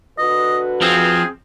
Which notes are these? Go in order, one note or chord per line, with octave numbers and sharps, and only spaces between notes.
D3 F#4 B4 D#5
F3 C4 G#4